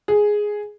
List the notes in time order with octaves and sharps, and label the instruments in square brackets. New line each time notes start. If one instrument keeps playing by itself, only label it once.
[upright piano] G#4